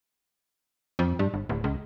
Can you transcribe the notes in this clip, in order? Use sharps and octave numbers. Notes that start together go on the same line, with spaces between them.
F2
G2
G1
D1
C#2